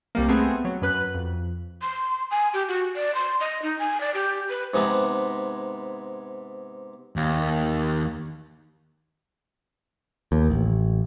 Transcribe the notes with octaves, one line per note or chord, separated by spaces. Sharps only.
C2 G3 A#3
A3 B3 C4 G#4
F#3
F#2 B4 F#6
F2
C6
G#5
G4
F#4
D5
C6
D#5
D#4
G#5
D5
G4
B4
G#2 C3 G#3 B3
D#2
D#2
A1